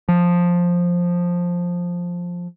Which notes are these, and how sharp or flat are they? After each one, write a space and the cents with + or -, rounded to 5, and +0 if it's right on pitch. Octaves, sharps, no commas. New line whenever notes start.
F3 +5